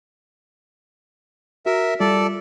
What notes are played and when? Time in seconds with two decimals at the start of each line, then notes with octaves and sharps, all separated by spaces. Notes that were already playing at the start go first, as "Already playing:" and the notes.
1.66 F#4 A#4 E5
2.00 G3 F4 A4 D5